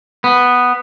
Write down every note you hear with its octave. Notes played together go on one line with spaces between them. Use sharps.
B3